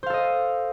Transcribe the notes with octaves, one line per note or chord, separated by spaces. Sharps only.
A4 C5 D#5 F5